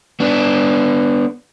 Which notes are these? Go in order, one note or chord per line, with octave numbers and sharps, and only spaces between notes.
B3 D4